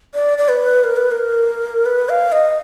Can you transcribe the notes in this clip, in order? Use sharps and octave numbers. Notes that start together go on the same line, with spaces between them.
D5
D5
B4
A#4
B4
A#4
B4
F5
D#5